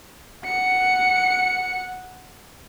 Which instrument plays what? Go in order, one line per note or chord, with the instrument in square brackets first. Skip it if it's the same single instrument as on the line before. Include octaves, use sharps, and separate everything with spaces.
[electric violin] F#5 C#7